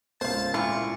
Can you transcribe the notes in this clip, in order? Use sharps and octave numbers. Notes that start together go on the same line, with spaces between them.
C#2 G#2 C5 F5 A5
A#2 E4 F5 C#6